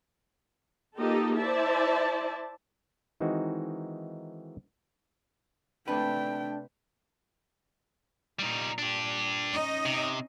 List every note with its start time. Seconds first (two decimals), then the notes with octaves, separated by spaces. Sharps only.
0.97 A#3 D#4 F4 G4 A4 D#5
1.38 E4 C5 D5 E5 A5
3.20 D#3 E3 G#3 C4 D#4 F#4
5.88 C3 A3 D4 B4 G5
8.39 A#2 G3 D#4
8.78 D4 G4
9.52 C#4 D#4 D#5
9.86 C3